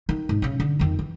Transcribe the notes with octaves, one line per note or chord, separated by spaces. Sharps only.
D#3
G#2
C#3 C#4
D3
F2 D#3
E3